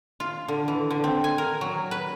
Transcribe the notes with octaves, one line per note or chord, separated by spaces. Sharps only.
F4
D3
E3
D3
C4
G#5
A#4
F#3
B4